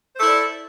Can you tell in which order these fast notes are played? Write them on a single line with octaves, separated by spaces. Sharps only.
C5 A4 E4 D5